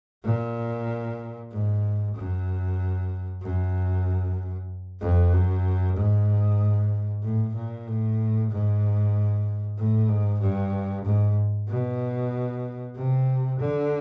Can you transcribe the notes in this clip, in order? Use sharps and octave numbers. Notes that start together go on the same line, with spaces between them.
A#2
G#2
F#2
F#2
F2
F#2
G#2
A2
A#2
A2
G#2
A2
G#2
G2
G#2
B2
C3
D3